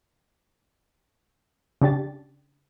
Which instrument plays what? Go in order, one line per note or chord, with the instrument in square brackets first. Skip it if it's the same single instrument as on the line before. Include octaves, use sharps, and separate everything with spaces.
[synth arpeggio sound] C#3 D4 G4 A6